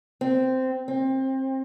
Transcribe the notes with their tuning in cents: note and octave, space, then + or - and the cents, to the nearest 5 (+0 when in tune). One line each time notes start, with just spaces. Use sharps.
C4 -10
C4 +25